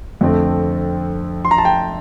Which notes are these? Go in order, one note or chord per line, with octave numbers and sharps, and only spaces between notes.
F2 D3 A3 C4
C6
A#5
A5
G5